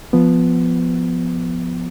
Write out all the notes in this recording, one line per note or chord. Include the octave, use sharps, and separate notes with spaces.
F3 B3